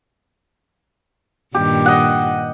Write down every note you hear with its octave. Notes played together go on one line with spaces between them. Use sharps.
G2 A#2 D#3 G4
D#5 F#5